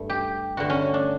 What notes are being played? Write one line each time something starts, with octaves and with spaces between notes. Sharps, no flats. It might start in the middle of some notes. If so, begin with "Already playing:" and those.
Already playing: G2 A3
G4
G2 D3 A3 F#4
C#4
D4